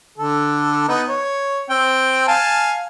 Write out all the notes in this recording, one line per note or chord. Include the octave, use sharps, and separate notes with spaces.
D3 A4
B3 D#4
C#5
C4 G5
F5 G#5 A5